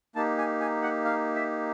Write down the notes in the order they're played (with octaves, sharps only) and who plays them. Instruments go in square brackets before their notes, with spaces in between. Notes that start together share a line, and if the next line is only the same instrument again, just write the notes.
[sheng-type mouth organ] A#3 D#4 G4 A5
G#5
G#5
F#5
F5
E5